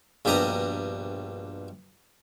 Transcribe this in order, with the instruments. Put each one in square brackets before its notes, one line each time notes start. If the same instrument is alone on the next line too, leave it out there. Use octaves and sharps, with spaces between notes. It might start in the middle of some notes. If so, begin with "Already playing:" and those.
[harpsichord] A#1 G2 B2 G4 D#5 A#5